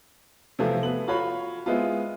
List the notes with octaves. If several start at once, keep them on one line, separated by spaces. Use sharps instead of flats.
C3 E3 F3 A3 C4
A3 B3 F#7
F4 F#4 C#5 B5
G#3 B3 C4 E4 F4